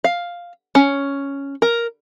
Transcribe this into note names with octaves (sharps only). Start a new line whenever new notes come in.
F5
C#4
A#4